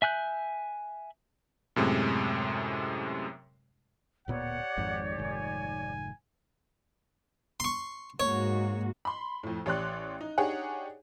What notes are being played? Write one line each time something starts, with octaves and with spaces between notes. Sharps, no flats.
E5 G#5 F#6 G6
F#2 A2 C3 G#3
D1 A#2 B3 G4 C#5 D5 F#5
G#1 F2 G#2
F1 G#2 D#3 G#5
C6 C#6
G#2 A#3 F#4 C#5
B5 C6
F2 A2
A1 G4 C#5 D5 C6 F#6
D#4
D4 D#4 G4 G#4 C#5 F#5